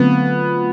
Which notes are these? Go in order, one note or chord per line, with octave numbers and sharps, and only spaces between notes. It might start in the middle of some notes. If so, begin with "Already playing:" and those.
Already playing: D3 F#3 A3 B3 C4 F4